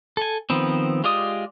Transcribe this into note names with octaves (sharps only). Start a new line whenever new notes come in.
A4 G#5
D#3 F3 B3 C4
G#3 F4 G4 D5 D#6